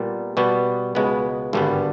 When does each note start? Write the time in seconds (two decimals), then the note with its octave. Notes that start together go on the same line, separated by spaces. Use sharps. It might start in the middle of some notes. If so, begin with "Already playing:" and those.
Already playing: A#2 G3 B3
0.37 B2 G3 B3
0.95 C#2 B2 G#3 B3
1.53 G#1 G2 D3 G3 B3